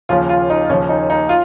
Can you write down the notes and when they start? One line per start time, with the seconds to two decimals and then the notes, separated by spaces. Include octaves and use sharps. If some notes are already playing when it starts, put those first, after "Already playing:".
0.09 D#2 C#3 F3 F4
0.29 F4
0.50 D#4
0.69 D#2 C#3 F3 C#4
0.89 D#4
1.10 D#4
1.29 F4